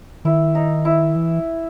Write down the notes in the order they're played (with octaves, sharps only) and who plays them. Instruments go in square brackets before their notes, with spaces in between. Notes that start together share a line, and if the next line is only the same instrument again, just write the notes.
[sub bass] D#3 [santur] E4
[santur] D#4
E4
[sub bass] E3